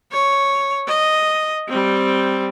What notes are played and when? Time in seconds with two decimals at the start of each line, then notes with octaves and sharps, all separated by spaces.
0.12 C#5
0.87 D#5
1.68 G3 C4